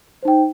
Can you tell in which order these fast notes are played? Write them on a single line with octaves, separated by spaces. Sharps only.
C5 D#4 G5